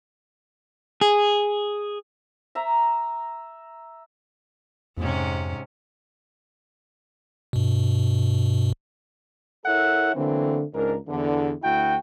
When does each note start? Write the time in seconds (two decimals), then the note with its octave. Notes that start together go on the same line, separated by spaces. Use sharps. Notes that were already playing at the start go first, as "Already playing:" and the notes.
1.01 G#4
2.55 E5 A#5
4.97 F2 G#2 C3 C#4
7.53 G2 B2
9.66 E4 A4 A#4 C#5 E5 F#5
10.15 D3 E3 F#3 A3 A#3 C4
10.74 C#2 G#2 D4 A#4
11.07 E2 D3
11.63 D2 E4 F#4 G5